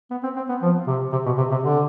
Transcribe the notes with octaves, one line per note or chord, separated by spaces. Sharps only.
B3
C4
C4
B3
F3
C3
C3
B2
C3
C3
D3